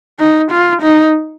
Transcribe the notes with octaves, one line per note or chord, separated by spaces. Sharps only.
D#4
F4
D#4